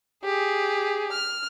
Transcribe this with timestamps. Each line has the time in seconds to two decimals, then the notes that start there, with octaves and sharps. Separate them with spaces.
0.24 G4 G#4
1.12 F6